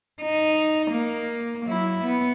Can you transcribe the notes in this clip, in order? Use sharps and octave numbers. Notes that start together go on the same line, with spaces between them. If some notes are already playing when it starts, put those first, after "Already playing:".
D#4
A#3
F#3 E4
B3